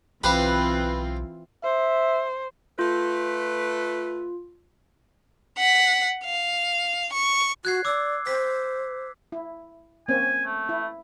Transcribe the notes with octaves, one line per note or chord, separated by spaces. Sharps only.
B1 E3 C4 F4 G4 B4 C5 F5
C5 E5
A3 F4 B4
F#5 B6
F5
C#6
F#4 F#6 G#6 C7
D5 D6 E6
C5 B6
E4
A#3 C4 C#4 G#5
A3
E4